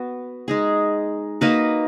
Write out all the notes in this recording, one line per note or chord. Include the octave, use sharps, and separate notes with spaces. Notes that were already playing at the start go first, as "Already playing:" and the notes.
Already playing: B3 F#4 B4
G#3 D#4 G#4
A#3 D#4 F#4 B4